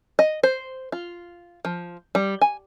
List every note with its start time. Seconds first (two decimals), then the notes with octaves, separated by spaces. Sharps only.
0.19 D#5
0.43 C5
0.92 F4
1.65 F3
2.15 G3
2.41 G#5